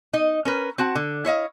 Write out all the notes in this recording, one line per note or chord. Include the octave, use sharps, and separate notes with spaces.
D#4 D#5
C#4 A#4 B4
C4 F#4 F#5 A5
D3
E4 C#5 D#5 F5